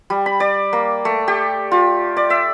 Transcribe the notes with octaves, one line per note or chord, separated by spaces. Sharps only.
G3
B5
D5
A#3
A3
G4
F4
D5
E5